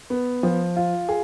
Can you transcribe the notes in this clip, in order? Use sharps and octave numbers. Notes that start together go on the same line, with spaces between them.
B3
F3
F4
G#4